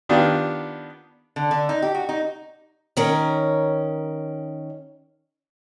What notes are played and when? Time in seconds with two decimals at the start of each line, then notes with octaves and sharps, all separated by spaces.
0.09 D#3 B3 D4 F4 G4
1.36 D3
1.51 D3
1.69 D#4
1.82 G4
1.95 F#4
2.09 D#4
2.97 D#3 C#4 A#4